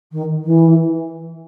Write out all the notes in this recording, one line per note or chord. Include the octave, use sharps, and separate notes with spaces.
D#3
E3